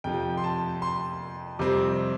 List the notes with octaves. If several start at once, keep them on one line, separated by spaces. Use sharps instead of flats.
F2 C3 F3 G5
C6
A5
C6
F2 C3 G3 C4 D6